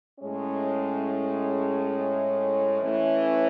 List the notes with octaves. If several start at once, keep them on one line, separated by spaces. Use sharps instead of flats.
A2 G#3 C#4
E3 A3 C#4